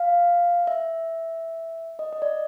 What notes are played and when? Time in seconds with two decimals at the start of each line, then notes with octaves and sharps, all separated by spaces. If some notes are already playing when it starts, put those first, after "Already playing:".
Already playing: F5
0.67 E5
1.99 D#5
2.13 D#5
2.22 D5